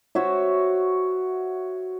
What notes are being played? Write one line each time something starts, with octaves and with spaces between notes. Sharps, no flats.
F#4 C5 C#5 E5